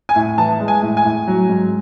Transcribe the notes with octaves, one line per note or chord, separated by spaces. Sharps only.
G#5
A2
E3 A5
G#3
G#5
A2
G#5
A2
F#3
G#2